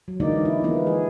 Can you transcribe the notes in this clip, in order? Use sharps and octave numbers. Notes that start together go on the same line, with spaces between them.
F#3
D3 E3 G#3 A#3 D#4 D5
E4
E3 F3 G#3 A#3 B3
G#4